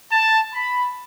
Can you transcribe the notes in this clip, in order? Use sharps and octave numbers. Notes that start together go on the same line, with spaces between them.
A5
B5